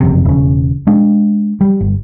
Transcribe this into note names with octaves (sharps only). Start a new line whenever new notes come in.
F#1 F2 C3
E1 C#3
G#3 D4
G3
G1